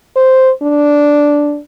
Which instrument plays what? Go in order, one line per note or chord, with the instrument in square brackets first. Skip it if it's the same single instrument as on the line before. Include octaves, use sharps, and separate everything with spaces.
[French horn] C5
D4